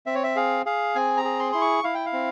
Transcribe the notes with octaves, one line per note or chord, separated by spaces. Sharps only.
C4 E5
C#5
E5
G#4 F5
G#4 F5
C4 G#5
A#5
G#4
C6
E4 C6
C#6
E4 F5
G5
F5
C4